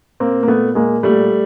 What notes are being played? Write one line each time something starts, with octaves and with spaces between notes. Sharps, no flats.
A#2 A#3 C4
A#3
A#2 A3 B3
A#2 G#3 A#3
A#2 G3 A3